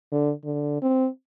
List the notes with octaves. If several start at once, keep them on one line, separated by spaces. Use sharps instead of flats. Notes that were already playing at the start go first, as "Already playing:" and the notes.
D3
D3
C4